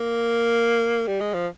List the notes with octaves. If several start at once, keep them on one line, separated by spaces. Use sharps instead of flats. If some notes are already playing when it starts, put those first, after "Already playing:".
Already playing: A#3
G3
G#3
F3